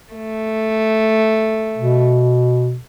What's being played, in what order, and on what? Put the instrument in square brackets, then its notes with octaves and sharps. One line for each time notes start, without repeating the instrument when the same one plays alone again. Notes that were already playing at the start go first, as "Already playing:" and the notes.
[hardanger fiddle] A3
[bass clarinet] B2